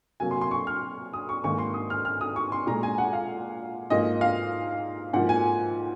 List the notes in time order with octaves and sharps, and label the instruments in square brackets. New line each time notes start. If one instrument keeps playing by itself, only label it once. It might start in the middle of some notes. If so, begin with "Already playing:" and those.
[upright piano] C3 F#3 A#3 G#5
C6
C6
C#6
F6
D#6
C#6
G#2 D#3 A#3 C#6
C6
D#6
F6
F6
D#6
C#6
C6
A#2 G#3 A#5
G#5
F#5
F5
G#2 F3 A#3 D#5
F5
G#2 F3 A#3 F#5
G#5